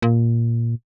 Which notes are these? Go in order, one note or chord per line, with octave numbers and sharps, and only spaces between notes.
A#2